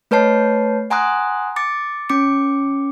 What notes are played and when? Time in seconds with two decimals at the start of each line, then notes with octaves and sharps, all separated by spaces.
0.11 A3 B4 C#5 A5 C7
0.90 F#5 G#5 A#5 C6 D#6 F#6
1.56 D6 A6 C#7
2.09 C#4 D6 C#7